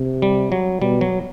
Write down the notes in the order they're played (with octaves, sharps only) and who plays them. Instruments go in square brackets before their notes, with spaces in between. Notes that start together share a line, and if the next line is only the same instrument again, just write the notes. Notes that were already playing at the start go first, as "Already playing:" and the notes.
Already playing: [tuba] C3
[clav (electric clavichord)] G3
F#3
[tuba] B2 [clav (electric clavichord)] G3
[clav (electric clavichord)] F#3